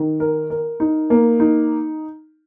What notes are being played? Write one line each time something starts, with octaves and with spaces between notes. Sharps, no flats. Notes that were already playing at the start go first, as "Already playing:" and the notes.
Already playing: D#3
A#4
A#4
D#4
A#3
D#4